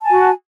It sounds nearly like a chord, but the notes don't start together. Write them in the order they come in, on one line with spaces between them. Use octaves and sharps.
A5 G#5 F#4